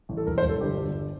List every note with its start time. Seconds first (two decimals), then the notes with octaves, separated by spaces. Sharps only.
0.09 A1
0.17 A4
0.27 E1 A#4
0.38 C5
0.43 E1
0.49 A4
0.60 G1 G4
0.78 G1